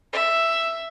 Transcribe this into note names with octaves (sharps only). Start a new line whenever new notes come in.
E5